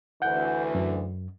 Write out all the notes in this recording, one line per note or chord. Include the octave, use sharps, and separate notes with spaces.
D2 E3 F#5 G6
F#2